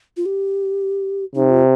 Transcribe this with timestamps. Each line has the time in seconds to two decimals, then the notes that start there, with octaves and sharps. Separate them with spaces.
0.17 F4
0.26 G4
1.35 C3 D#4
1.50 F4